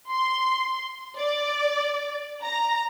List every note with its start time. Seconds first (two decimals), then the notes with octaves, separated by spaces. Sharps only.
0.11 C6
1.17 D5
2.43 A#5